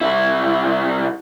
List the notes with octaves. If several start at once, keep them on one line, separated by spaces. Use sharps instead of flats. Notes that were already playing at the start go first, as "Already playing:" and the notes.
C2 E4